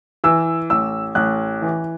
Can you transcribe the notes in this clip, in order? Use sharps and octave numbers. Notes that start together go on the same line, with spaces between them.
E3 E6
A1 E6
A1 F#6
E3